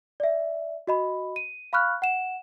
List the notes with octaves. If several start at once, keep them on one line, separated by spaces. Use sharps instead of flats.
D5 E5
F#4 D#5 B5
D#7
F5 B5 C#6 F6 F#6
F#5 E7